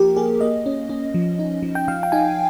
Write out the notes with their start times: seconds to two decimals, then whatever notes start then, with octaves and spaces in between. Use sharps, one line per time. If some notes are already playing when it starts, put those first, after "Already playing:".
Already playing: F3 A#3 G4 A#4
0.16 A#3 G#4
0.41 A#3 D#5
0.66 C#4
0.90 C#4
1.14 F3
1.39 D#4
1.63 F3
1.75 G5
1.88 F3 F5
2.03 G5
2.12 D#4 G#5